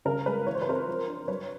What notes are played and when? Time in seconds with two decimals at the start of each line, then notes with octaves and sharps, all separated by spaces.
0.05 C#3 A#4
0.26 G#3 B4
0.46 E3 C#5
0.55 C5
0.62 B4
0.68 C4 A#4 C5
0.87 F3
1.08 D4
1.28 F#3 B4 C#5